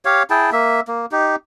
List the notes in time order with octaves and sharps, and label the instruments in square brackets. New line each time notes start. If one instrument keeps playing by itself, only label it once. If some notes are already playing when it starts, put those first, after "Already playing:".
[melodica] G4 C#5 F5
E4 G#4 G5 A5
A#3 E5
A#3
D#4 G4